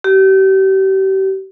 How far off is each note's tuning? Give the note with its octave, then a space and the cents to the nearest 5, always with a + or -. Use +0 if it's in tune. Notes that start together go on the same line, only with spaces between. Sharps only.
G4 -35